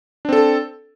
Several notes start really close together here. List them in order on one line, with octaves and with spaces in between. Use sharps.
D4 C4 A4